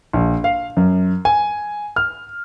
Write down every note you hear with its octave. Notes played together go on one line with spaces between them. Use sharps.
A#1
F5
F#2
G#5
F6